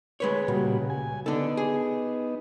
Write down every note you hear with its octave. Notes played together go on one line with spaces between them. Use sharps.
G#3 B4 C#5
C#2 A#2 G3 F#4
G#5
D3 B3 D#4 A4
G#4